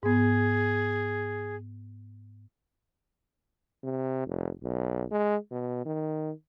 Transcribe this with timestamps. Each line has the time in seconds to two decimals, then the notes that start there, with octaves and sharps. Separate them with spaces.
0.03 G#2 B3 G#4
3.84 C3
4.26 F1
4.63 B1
5.11 G#3
5.52 B2
5.86 D#3